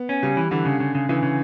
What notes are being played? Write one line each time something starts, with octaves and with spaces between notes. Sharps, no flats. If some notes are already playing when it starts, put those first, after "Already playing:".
Already playing: B3
C#4
C#3 G3
E3
D3 E3
C#3
C#3
C#3
C#3 E3
C#3